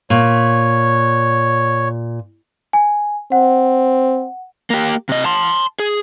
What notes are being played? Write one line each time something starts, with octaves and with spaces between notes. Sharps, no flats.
A#2 C#5
G#5
C4 F#5
A#3 G4
C3 D#5
A5 C6
G#4